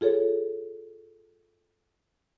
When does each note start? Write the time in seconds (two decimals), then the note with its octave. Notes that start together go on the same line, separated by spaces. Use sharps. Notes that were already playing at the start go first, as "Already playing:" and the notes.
0.01 F4 G#4 A4 C#5